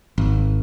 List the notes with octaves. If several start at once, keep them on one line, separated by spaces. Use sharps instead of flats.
G#1